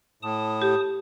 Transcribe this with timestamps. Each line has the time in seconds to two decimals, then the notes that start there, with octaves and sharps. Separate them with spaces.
0.22 A2 A5 D#6
0.62 G4